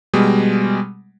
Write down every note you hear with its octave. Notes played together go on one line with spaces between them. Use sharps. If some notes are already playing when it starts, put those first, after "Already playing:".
B2 G3 G#3